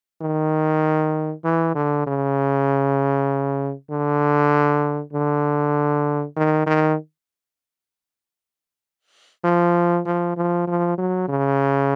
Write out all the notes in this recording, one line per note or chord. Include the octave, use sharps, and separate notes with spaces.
D#3
E3
D3
C#3
D3
D3
D#3
D#3
F3
F3
F3
F3
F#3
C#3